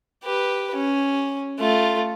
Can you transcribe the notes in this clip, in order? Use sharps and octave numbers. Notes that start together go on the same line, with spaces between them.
G4 B4
C#4
A3 F4